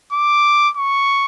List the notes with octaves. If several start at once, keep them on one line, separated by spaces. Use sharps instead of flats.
D6
C#6